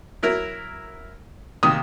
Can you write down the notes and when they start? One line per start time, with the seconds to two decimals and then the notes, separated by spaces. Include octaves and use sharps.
0.23 F#3 E4 A#4
1.63 C3 D#3 A#3 D#6